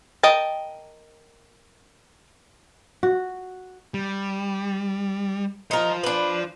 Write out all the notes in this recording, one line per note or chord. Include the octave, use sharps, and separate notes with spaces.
A#4 D#5 G5 A5
F#4
G3
D#4 F4 A#4 C5
D4 B4